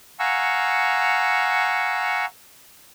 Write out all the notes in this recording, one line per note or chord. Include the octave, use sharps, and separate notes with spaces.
F5 F#5 G#5 A#5 C#6 E6